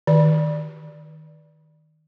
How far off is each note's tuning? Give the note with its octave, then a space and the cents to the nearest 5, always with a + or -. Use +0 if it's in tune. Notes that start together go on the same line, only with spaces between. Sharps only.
D#3 +0 D5 +0